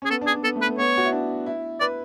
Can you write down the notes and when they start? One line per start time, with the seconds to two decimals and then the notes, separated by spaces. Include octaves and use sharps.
0.02 C#4
0.05 G#4
0.10 B3 A4
0.21 D4
0.27 G#4
0.33 D4
0.44 B3 A4
0.56 A3
0.62 B4
0.67 B3
0.78 B3 C#5
0.98 F#4
1.05 E4
1.12 D4
1.46 E4
1.80 B4 D5